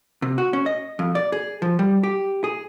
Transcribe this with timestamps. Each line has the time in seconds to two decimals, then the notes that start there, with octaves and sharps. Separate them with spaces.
0.22 C3
0.38 F#4
0.53 C#4
0.66 D#5
0.99 F2
1.15 D5
1.32 G#4
1.62 F3
1.79 G3
2.03 G4
2.44 G#4